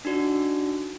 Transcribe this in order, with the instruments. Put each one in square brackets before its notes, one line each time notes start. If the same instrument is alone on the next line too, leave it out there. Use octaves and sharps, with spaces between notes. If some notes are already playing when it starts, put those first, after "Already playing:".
[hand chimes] D4 D#4 F#4 D5